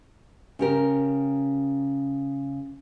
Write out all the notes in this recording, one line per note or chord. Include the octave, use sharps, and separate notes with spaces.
C#3 G4 A#4